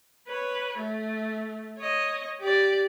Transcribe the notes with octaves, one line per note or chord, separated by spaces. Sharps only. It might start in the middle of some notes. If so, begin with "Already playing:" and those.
B4 C#5
A3
C#5 D#5
G4 D5